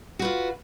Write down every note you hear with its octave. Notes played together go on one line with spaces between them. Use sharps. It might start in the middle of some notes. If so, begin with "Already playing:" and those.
F4 F#4 B4